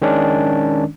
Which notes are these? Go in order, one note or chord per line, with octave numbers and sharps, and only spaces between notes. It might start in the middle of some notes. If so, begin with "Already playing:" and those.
D#3 G#3 C#4 D4